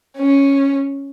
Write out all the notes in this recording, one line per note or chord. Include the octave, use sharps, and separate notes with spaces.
C#4